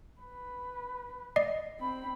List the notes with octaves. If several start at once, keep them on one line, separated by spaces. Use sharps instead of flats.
B4
D5 D#5 C7
C4 B5